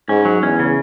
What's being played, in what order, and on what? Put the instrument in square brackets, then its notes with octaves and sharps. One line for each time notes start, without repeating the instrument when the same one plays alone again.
[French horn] G#2 [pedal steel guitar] C#4
[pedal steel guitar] F#3
[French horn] E2 [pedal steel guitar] C#4
[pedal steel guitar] C#3